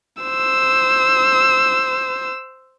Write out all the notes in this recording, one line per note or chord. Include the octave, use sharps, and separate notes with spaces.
C5 E6